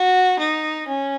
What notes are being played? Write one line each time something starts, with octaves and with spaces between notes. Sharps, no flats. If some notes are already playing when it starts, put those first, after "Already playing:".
Already playing: F#4
D#4
C#4